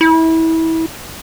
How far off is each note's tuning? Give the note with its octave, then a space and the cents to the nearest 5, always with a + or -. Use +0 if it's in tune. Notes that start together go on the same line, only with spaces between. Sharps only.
E4 -25